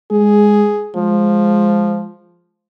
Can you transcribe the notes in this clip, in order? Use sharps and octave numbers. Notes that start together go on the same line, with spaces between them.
G#3 G#4
F3 G#3